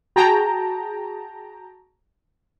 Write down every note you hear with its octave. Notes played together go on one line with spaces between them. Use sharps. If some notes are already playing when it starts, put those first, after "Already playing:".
F#4 G#4 G5 A5 A#5